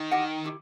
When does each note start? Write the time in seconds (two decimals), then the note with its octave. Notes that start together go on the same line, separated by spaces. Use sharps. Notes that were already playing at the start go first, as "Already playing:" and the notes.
Already playing: D#3
0.11 E4 G4 D#5 F#5
0.44 E4 G4